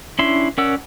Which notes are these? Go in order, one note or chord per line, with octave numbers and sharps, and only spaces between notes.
C#4 D4 E4 C6
C#4 A#4 D5 F#5 E6